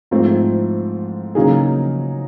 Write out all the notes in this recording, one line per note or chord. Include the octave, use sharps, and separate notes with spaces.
G#2 F3 A3 C4
C#3 F#3 A#3 D#4 G#4